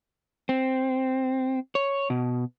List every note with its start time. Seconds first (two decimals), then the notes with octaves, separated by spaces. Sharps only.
0.49 C4
1.75 C#5
2.10 B2